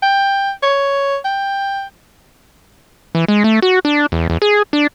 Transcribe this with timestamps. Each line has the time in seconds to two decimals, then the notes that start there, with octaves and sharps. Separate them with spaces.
0.03 G5
0.63 C#5
1.25 G5
3.15 E3
3.28 G#3
3.44 A3
3.62 F#4
3.85 D4
4.12 E2
4.30 E2
4.42 G#4
4.73 D4